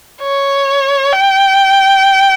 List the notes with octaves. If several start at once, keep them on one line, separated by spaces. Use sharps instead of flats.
C#5
G5